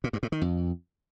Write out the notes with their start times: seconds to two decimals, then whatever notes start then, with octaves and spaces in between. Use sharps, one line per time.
0.04 A#2
0.13 G2
0.23 A2
0.32 D#3
0.42 F2